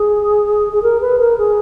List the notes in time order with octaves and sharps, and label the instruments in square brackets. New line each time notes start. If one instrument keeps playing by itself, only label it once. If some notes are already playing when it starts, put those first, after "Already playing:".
Already playing: [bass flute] G#4
G#4
A#4
B4
A#4
G#4